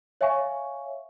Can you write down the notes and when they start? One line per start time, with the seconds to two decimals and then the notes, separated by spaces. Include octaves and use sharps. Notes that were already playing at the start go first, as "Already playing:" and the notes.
0.21 C#5 E5 F5 G#5 C#6